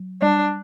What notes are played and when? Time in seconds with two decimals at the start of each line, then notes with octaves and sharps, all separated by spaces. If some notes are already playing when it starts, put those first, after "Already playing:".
Already playing: F#3
0.22 G3 D4